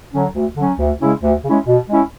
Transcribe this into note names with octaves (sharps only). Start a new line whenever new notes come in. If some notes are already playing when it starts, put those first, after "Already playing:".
D3 F#3 C#4
D2
D3 F#3 C#4
D2
C#3 G#3 C#4 E4
D2
C#3 G#3 C#4 E4
B2
G#3 C#4 E4